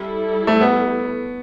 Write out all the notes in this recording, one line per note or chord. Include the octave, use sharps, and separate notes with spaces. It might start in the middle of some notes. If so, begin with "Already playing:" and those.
Already playing: G3 E4 A4
A3
B3